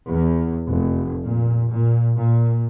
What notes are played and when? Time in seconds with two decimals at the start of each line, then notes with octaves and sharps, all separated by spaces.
0.11 E2
0.69 F1
1.23 A#2
1.71 A#2
2.19 A#2